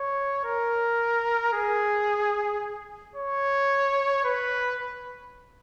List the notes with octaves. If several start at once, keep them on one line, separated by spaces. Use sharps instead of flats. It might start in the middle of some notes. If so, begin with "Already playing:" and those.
Already playing: C#5
A#4
G#4
C#5
B4